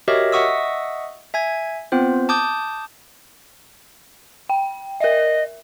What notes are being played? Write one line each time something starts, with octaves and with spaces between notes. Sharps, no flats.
F#4 G4 A#4 C#5 D#5 E5
D#5 E5 F#5 C#6 D#6 E6
E5 G#5 G#6
B3 C4 F4 C5
A5 D6 D#6 G6
G5
A#4 D#5 E5